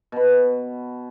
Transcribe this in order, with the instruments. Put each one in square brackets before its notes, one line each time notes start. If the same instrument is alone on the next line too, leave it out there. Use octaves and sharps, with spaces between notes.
[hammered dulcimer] B2 B5